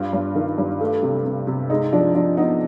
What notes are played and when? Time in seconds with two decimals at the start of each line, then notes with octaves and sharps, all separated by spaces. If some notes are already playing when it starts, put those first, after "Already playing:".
Already playing: G2 F4
0.13 G2
0.35 D#3
0.58 G2
0.81 A3
1.03 C3
1.25 C3
1.47 C3
1.70 G#3 D#4
1.93 F3 D4
2.15 F3 D4
2.37 B3 D#4